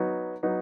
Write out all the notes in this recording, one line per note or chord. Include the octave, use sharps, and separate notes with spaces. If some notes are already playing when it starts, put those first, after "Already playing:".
Already playing: F#3 B3 D#4
F#3 B3 D#4